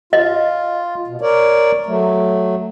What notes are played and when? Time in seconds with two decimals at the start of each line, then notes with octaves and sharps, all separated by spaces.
0.13 F4 D#5
1.08 B2
1.21 A#4 C#5 D5
1.86 F#3 A3